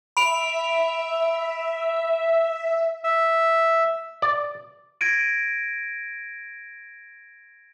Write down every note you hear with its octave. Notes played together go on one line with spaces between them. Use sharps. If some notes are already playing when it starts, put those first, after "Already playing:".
E5 B5 D7 F7
E5
D5
G#6 A#6 D7 D#7